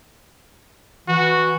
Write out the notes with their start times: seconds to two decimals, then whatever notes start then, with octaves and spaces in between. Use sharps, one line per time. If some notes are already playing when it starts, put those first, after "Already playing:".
1.08 E3 F#4